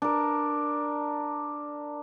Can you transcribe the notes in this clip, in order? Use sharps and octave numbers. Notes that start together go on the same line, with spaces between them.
D4 A#4